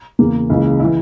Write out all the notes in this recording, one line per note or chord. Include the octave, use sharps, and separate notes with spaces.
E2 C#3 E3 A#3
C#2 C#3 E3
E4
E3